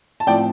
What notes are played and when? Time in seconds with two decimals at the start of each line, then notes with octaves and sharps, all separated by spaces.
0.20 A5
0.27 A2 F3 C4 D5 G5